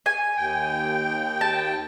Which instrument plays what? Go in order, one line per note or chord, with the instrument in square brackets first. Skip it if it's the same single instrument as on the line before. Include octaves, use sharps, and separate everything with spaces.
[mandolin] G#5
[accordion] D#2 G5
[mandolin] A5